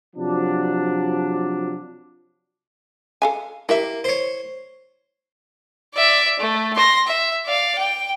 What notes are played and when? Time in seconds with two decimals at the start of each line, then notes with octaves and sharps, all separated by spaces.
0.16 C3 F3 F#3 D4
3.22 A4 F5 G#5
3.69 A#3 E4 G4 E5
4.04 C5 C#5
5.95 D5 E5
6.39 A3
6.76 C6 A#6
7.07 E5
7.46 D5 F5
7.79 G5